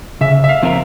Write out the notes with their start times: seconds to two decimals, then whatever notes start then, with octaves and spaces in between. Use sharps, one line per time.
0.21 C#3 E5
0.44 E5
0.49 F5
0.63 F3 C4 F4 A#4